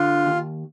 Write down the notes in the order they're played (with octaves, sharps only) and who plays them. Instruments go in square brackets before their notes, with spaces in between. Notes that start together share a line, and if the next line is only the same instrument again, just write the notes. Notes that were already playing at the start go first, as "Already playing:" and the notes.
Already playing: [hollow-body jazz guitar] D3 [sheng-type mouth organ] F4
[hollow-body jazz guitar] D#2